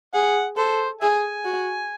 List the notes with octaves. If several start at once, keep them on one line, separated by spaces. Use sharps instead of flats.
G#4 F#5
A4 C5
G#4 E5 G#5
F#4